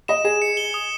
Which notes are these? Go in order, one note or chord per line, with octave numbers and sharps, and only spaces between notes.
D#5 E7
G#4 E7
C#7
G7
D#6